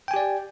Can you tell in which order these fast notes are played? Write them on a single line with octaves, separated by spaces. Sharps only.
G5 G#5 G4 D5